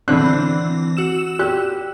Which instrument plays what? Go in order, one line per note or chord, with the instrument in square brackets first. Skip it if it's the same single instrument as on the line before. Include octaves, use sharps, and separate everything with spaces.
[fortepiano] D3 F#6 [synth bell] E3 C4
[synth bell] F#4 E6 E7
[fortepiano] G4 F#6